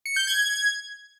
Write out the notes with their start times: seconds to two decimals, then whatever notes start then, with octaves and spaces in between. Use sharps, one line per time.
0.06 C#7
0.16 G6
0.27 G#6